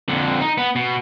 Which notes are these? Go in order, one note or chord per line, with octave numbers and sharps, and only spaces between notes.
F2 D3
D#4
B3
B2